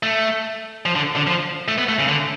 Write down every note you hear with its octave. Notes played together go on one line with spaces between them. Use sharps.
A3
F3
D3
D3
F3
A3
B3
A3
C#3
D3